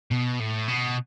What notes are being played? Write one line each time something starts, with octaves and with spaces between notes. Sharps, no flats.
B2
A2
B2